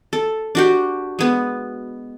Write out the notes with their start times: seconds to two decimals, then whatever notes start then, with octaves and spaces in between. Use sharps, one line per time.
0.13 A4
0.55 D4 F#4 G4
1.19 G#3 B3